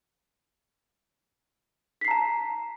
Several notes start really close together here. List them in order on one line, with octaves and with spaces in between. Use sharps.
B6 C7 A#5 A5